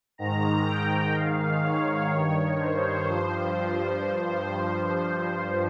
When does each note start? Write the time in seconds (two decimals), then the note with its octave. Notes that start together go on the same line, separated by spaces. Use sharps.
0.18 G#2 D#3 A#5
0.67 G5
1.14 G#2 D#3 F5
1.63 C#5
2.10 G2 D#3
2.59 C5
3.06 G2 F3